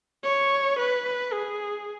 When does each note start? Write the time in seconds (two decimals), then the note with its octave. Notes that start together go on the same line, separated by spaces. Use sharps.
0.24 C#5
0.79 B4
1.33 G#4